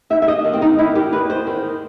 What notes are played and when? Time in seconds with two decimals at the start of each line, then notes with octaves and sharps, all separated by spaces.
0.10 D#2 E5
0.22 E5
0.27 D#2 D#5
0.45 D#3
0.53 C4
0.61 D#3 D#4
0.79 E2 E4
0.95 D#3 G4
1.12 E2 B4
1.29 E2 C5
1.47 D#3